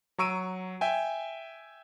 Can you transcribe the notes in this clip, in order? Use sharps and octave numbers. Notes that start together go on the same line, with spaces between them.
F#3 A#5 C#6 E6 D7 D#7
E5 G5 G#5